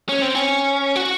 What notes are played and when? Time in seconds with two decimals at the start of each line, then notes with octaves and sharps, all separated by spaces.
0.09 C#4
0.22 C4
0.35 C#4
0.96 F#4